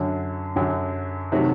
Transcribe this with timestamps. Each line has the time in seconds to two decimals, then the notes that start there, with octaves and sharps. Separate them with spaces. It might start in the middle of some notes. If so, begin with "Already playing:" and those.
Already playing: F#2 D3 F#3
0.56 F#2 D3 F#3
1.32 C3 D#3 F#3 A3